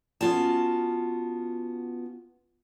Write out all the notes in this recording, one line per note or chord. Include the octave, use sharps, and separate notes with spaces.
B3 C#4 F4 F#4 A5